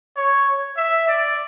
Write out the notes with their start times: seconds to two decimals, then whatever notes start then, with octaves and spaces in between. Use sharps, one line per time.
0.17 C#5
0.77 E5
1.08 D5